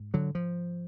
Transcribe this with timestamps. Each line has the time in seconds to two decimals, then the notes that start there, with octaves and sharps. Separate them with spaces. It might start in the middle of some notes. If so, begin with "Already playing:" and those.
Already playing: G#2
0.14 D3 F#3
0.35 F3